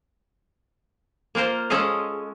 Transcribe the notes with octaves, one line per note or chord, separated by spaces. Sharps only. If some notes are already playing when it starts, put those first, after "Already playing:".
A#3 F4 A#4 C5
G#3 C#4 A4 D#5 F5